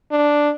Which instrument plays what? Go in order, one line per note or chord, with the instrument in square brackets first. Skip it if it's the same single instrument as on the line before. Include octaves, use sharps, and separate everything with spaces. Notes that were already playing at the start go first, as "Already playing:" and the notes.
[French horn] D4